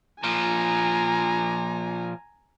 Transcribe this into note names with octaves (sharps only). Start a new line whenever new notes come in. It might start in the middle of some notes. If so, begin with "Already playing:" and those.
A#2 F3 G#5 A#5